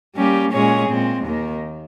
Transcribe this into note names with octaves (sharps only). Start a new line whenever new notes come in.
G3 A#3 C#4 G4
A#2 G#3 C#4 G#4 C#5
A#2 G#3 C4
D#2 D#3 A#3